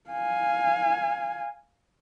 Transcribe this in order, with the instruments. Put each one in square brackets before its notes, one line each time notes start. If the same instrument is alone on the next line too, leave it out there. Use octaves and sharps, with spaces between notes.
[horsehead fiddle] F5 G#5